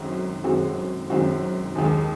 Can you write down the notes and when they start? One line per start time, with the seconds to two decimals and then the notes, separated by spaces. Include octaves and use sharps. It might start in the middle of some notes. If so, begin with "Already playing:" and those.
Already playing: F#2 D#3 G#3 C4 F#4
0.44 F#2 D#3 G#3 C4 F#4
1.10 F#2 D#3 G#3 C4 F#4
1.75 D#2 D#3 G#3